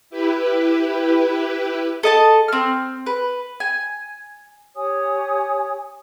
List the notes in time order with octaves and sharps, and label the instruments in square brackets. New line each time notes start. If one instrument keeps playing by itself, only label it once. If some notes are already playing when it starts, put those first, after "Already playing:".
[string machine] E4 G4 B4
[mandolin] A4 D#5 A5
C4 F6
B4
G#5
[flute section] G4 C#5 G#5 D#6